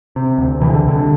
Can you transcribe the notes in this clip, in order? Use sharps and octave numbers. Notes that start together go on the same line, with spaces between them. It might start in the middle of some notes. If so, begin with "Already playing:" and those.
C3
D2
C3 E3
D3
C2 D3